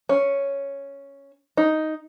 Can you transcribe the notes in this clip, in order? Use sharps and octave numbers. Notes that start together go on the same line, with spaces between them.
C#4
D#4